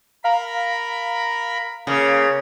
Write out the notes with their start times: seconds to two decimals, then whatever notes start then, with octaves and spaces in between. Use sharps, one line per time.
0.24 A#4 F5 A#5 B5
1.87 C#3 A#3